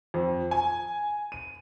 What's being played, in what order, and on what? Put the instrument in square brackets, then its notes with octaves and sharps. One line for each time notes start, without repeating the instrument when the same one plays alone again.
[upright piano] F2
G#5
D#7